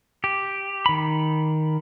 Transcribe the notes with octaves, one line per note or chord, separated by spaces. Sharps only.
G4
D#3 B5